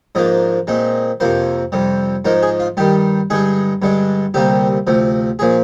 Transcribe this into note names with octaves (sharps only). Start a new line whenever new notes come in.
G#2 F3 A#3 D4 D#5
A#2 G#3 C4 D#4
F2 C3 F3 A#3 C5
F2 C3 G3
G#2 F3 G#3 D#4 A#4
G#4
F4
G2 D#3 G3 G4
G2 D3 G#3 D#4 G#4
G2 D3 G#3 D4
D2 C3 G3 A#3 G4
D2 C3 F3
A#2 F3 G#4